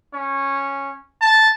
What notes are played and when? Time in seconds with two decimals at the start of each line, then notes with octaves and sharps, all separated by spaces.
0.14 C#4
1.22 A5